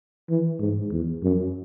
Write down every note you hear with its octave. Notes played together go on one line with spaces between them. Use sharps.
E3
G#2
E2
F#2